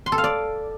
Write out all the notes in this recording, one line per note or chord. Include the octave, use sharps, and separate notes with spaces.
C6
A4
F5
D5